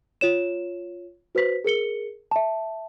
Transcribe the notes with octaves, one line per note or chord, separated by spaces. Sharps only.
F4 C#5 E7
F#4 B4 C5 B6
G#4 A#4 C#7 G7
E5 A5